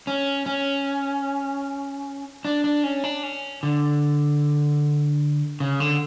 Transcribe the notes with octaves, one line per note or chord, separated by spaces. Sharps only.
C#4
C#4
D4
D4
C#4
D4
C#4
D3
C#3
D3